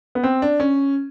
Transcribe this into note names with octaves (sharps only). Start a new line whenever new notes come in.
B3
C4
D4
C#4